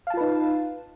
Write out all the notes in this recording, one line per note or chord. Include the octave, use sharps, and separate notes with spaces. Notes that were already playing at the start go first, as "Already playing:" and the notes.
D#4 F4 B4 F5 A5